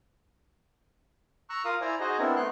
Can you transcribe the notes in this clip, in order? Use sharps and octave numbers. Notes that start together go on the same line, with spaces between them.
A#5 C#6 E6 F#6
F4 A#4 F5 D#6
E4 C5 D5 G#5 A#5
D#4 F#4 G#4 C5 D#5
B3 C4 D4 E4 A#4
A3 B3 D#4 C6 F#6